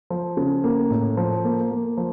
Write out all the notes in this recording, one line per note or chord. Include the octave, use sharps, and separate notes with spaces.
F3
C#3
A#3
A2
F3
A#3
A#3
F3